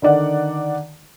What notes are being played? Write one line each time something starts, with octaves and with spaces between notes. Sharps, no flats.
D3 D#3 D5 F#5